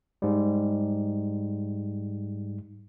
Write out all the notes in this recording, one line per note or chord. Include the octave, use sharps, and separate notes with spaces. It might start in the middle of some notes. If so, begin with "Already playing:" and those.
G#2 G3